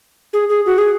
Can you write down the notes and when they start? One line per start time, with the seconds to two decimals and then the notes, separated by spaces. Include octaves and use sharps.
0.33 G#4
0.49 G#4
0.66 F#4
0.78 G#4